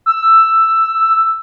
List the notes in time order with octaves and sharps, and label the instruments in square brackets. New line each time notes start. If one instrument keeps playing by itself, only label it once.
[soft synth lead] E6